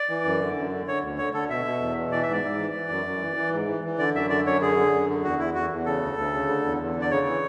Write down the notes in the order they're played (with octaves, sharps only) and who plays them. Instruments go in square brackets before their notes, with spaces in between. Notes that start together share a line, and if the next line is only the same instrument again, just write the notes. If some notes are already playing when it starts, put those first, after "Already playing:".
Already playing: [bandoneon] D5
E3
F#2
D3
F#2
D3
D3 C#5
D2
D3 C#5
D3 A4
B2 E5
B2
E2
B2
E3 D5
E5
G#2 D5
G#2
E3
E3
F#2
F#2
E3
E3
G#2
E3
E3
D3 D5
F#2 E5
D3 D5
F#2 C#5
D3 G#4
D3
F#2
D3
E2 F#4
E2 E4
E2 F#4
E2
C#3 A4
D2
D2
C#3
D3
E2
E2
D3
D5
C#3 C#5
E3